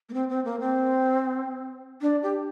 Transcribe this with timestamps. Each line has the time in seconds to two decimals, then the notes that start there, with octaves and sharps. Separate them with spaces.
0.09 A#3
0.14 C4
0.29 C4
0.45 A#3
0.60 C4
2.02 D4
2.23 G4